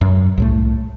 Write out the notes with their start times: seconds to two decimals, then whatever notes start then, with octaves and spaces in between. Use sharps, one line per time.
0.01 F#2
0.38 C2 A2 A3